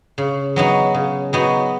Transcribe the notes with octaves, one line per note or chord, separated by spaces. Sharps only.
C#3
F#3 B3 D#4 F#4
C#3
F#3 B3 D#4 F#4